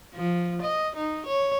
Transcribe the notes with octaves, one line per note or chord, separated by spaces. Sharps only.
F3
D#5
D#4
C#5